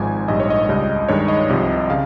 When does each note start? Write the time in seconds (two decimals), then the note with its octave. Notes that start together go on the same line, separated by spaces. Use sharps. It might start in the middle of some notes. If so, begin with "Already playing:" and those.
Already playing: G#1 G#2 F3 G#5
0.28 A#1 G#2 G3 D#5
0.40 C#5
0.50 D#5
0.69 C#2 C#3 G3
1.08 G2 D#3 G#3 C#5
1.28 D#5
1.49 C2 C3 F3
1.90 C#3 F5